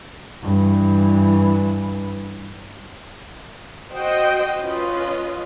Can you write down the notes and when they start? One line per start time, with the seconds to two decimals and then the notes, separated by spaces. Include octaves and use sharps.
0.42 G2 E3
3.93 F#4 C5 D#5 F#5 G5
4.61 C#4 F4 B4 D#5